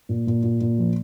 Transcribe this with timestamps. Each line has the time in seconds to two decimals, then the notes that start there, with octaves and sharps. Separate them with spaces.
0.09 A#2
0.27 A#2
0.43 A#2
0.61 A#2
0.78 F3